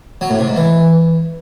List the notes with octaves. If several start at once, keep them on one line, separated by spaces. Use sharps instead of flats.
F#3
A2
C3
G#2
E3